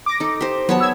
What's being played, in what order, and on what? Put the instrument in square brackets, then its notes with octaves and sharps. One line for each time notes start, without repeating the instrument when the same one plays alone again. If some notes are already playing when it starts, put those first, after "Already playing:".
[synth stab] D6 A#6
[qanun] D#4 A4
G4 C5
[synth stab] F#3 [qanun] B3 C#5 A5
[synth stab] E6 G#6